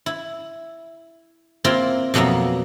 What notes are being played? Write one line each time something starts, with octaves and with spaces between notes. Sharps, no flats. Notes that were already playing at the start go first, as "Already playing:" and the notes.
E4
A#3 C4 E4 F4 A#4
F2 B2 F#3 A#3 E5